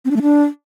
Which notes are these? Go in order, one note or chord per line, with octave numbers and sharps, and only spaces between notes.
C4
D4
A3
D4